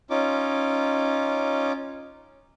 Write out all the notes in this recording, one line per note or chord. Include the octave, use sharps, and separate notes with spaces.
C#4 D#4 F4 D6